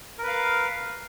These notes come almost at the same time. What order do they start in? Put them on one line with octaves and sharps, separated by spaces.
A#4 B4 F5